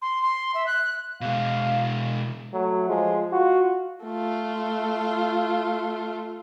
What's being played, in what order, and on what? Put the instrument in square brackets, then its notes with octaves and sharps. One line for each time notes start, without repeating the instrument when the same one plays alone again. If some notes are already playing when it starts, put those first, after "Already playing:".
[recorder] C6
C6
E5
F#6
[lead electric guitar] B2 G#3 [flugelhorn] F5
[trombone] F#3 [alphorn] A3
[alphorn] F3 [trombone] G#3
[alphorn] F4 [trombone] F#4
[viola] A3 F4